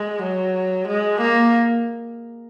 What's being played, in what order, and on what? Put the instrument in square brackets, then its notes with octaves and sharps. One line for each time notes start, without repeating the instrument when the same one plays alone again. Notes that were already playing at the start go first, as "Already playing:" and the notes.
Already playing: [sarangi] G#3
F#3
G#3
A#3